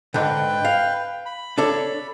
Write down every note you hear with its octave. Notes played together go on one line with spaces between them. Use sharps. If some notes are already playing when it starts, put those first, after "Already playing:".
G#2 D3 B4 G5
F5
B5
D4 A4 C#5